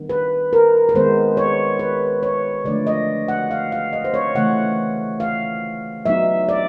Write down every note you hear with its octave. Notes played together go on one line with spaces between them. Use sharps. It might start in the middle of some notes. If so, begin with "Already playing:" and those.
Already playing: D#3 G3 B3 D4
B4
A#4
B4
D#3 G#3 B3 C5
C#5
B4
C#5
D3 F3 A3 D4 D5
D#5
F#5
F5
F5
D#5
C5
C#5
C#3 E3 A3 F#5
F5
F#3 B3 D#4 E5
D5